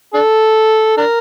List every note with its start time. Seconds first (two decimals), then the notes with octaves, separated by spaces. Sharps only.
0.14 D4 A4
0.97 D4 A#4